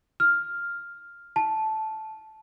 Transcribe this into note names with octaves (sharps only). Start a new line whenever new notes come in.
F6
A5